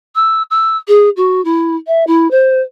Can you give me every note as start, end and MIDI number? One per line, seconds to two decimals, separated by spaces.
0.15 0.43 88
0.50 0.77 88
0.88 1.09 68
1.16 1.43 66
1.44 1.76 64
1.87 2.04 76
2.07 2.30 64
2.31 2.61 72